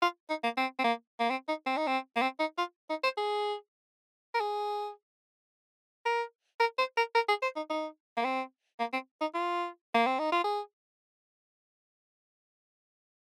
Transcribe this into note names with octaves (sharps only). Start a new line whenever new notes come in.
F4
D#4
A#3
C4
C4
A#3
A#3
C4
D#4
C4
D#4
C4
A#3
C4
D#4
F4
D#4
C5
G#4
A#4
G#4
A#4
A#4
C5
A#4
A#4
G#4
C5
D#4
D#4
A#3
C4
A#3
C4
D#4
F4
A#3
C4
D#4
F4
G#4